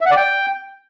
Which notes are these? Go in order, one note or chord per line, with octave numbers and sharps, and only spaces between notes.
E5
F#5
D5
G5